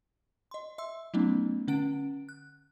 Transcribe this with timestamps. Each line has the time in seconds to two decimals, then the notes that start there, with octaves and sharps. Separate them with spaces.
0.51 D#5 C6
0.78 E5 C6 E6
1.14 F#3 A3 B3 C#4 D#4
1.68 D3 C#4 F#5 D7
2.29 F#6